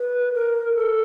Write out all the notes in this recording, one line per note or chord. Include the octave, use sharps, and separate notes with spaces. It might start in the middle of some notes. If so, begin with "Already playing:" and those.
Already playing: B4
A#4
A4